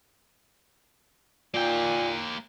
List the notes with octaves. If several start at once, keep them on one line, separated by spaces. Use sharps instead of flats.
A#2 A#3 G5